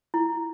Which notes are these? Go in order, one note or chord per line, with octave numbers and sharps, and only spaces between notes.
E4